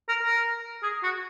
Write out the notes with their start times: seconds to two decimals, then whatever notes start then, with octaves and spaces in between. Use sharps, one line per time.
0.09 A#4
0.23 A#4
0.83 G#4
1.03 F#4